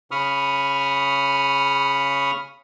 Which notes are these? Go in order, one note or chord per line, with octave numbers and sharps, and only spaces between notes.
C#3 B5 C#6 D#6 F6